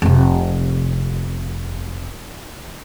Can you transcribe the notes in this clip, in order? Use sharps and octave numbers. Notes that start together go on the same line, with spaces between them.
F1 C3